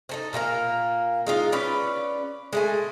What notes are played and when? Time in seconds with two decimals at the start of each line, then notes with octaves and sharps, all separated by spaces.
0.09 D#4 A4 C5
0.33 A#2 A#3 D#4 A#4
1.27 G#3 D#4 F4
1.52 C#4 B4 D5
2.53 G#3 A3 G#5